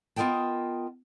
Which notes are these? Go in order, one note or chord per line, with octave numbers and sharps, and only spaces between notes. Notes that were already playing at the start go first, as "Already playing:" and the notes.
B3 F4 A#4 D#5 G5 A5